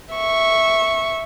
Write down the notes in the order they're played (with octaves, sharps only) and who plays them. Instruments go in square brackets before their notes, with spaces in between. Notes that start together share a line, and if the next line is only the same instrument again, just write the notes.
[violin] E5 C#6